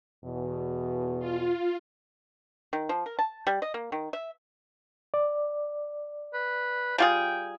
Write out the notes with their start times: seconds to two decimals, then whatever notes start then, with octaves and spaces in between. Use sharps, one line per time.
0.24 E2 B2
1.19 F4
2.73 D#3
2.89 F3
3.06 A#4
3.19 A5
3.47 G3
3.62 D#5
3.74 A#3
3.92 D#3
4.13 E5
5.14 D5
6.34 B4
6.98 G3 F4 G#4 G5